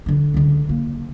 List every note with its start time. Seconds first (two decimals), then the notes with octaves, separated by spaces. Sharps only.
0.06 D3 D4
0.34 C#2 D3
0.69 A#3